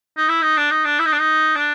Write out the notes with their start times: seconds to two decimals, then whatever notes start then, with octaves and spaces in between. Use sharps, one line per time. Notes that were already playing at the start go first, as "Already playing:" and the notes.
0.17 D#4
0.28 E4
0.42 D#4
0.57 D4
0.71 D#4
0.84 D4
0.99 E4
1.06 D#4
1.12 D4
1.20 D#4
1.55 D4